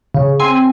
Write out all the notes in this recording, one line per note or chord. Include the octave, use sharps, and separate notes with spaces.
C#3
C4 G#5